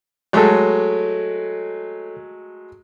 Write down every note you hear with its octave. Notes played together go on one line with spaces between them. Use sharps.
F#3 G#3 A3 A4 C#5